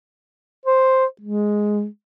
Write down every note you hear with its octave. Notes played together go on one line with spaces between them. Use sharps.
C5
G#3